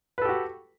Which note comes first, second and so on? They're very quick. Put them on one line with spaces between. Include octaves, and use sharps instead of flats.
B4 A4 G4 F#4